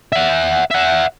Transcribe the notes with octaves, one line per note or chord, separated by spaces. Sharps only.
E5 F#5
E5 F#5